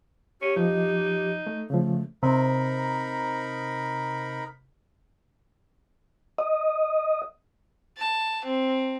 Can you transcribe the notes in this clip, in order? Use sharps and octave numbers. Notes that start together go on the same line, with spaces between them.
C#4 G4
F2 F3 D#4 D#5
A3
C#3 F3 A3
C3 D#4 A#4 B5
D#5
A5
C4